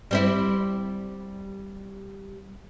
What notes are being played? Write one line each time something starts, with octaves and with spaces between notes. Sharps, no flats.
G3 C4 E4